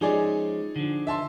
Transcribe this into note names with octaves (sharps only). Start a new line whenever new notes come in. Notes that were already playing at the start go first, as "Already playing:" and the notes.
F3 G#3 C#4 D#4 G#4 D5
D3 F3
E5 A5 C6